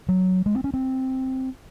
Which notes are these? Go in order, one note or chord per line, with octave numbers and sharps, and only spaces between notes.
F#3
G#3
C4
C#4
C4